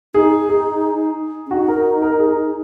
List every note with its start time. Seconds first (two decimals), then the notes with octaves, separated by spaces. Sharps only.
0.14 D#4 G#4
0.49 G#4
1.46 C#4
1.51 D#4 F#4
1.68 A#4
2.02 A#4
2.19 G#4